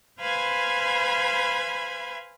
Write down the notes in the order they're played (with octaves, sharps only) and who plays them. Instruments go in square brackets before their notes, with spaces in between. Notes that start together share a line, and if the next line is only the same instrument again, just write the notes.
[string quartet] B4 C5 F5 G#5 B5 G#6